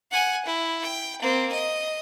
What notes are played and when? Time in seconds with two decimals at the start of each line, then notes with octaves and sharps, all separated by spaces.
0.11 F#5 G#5
0.45 E4
0.82 G5
1.21 A#3 C4
1.52 D#5